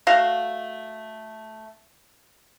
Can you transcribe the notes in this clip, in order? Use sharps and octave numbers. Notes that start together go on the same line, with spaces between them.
A3 F#4 F5